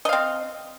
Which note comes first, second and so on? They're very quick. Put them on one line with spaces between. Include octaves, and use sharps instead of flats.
D#5 F5 C4